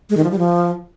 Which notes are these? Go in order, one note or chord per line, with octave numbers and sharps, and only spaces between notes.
G#3
D#3
F3
G3
F3